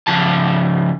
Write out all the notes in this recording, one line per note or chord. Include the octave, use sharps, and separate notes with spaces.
C#3 F3 A5